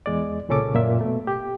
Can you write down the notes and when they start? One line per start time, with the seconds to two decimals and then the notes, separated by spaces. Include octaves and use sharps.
0.06 E2 G#3 D5
0.48 C2 A#2 C#3 C#4 A4 D6
0.75 F#2 A#2 A#3 E5
1.01 B2 A3
1.27 G4